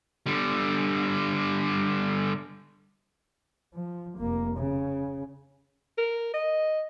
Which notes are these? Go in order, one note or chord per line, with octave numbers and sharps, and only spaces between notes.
D3 G3
F3
F1 A#3
C#3
A#4
D#5